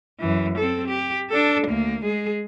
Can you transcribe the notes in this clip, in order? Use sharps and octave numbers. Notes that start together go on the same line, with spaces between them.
F#2 E3
C4 A4
G4
D4 A4
D2 A#3
G#3 G#4